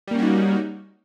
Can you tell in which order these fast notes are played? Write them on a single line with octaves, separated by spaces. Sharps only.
G3 A#3 C#4 F#4 D#4